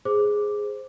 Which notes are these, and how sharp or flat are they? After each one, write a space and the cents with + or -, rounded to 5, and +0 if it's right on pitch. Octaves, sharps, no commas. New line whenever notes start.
G#4 +0 C5 +0 D6 +0